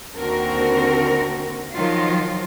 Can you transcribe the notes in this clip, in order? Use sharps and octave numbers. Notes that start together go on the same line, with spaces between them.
D#2 D3 C4 F#4 A#4
D#3 F3 F#3 F4